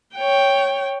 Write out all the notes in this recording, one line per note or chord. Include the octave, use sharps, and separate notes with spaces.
C#5 G5